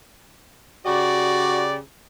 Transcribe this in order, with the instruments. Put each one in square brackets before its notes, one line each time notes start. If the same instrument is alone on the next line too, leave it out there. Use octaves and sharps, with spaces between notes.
[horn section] C#3 G4 D5 [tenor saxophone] F#4